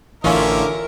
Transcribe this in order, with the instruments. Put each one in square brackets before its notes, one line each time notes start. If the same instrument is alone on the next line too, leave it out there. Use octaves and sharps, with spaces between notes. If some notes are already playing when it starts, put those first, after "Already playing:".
[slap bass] A1 E3 [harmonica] D3 E5 [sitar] C#4 F4 [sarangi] A#4